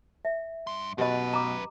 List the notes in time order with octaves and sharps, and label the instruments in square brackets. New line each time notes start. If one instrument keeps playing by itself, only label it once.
[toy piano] E5
[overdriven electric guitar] G2 C6
[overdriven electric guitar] F#2 B4 [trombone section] B2 [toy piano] G4 D#5
[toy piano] A#5 D6